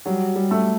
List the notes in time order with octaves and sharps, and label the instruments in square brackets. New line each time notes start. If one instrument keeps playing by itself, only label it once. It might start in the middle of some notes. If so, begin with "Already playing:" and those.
[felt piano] F#3 [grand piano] G3
[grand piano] G3
[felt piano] A3